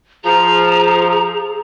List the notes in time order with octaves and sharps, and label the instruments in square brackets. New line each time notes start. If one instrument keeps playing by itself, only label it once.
[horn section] F3 [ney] G#4 [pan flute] A#5